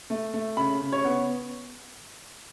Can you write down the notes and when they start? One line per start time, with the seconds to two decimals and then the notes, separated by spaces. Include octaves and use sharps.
0.10 A3
0.34 A3
0.57 C#3 B5
0.81 C#3
0.92 C#5
1.04 B3